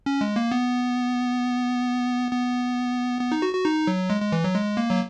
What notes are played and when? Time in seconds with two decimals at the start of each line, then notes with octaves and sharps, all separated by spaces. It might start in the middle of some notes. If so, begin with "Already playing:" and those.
0.06 C#4
0.21 G#3
0.36 A#3
0.52 B3
2.31 B3
3.21 B3
3.32 D#4
3.42 F#4
3.54 F#4
3.65 D#4
3.87 F#3
4.10 G#3
4.22 G#3
4.32 E3
4.44 F#3
4.56 G#3
4.77 A#3
4.90 F#3